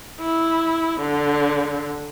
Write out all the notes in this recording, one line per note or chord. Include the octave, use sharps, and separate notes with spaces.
E4
D3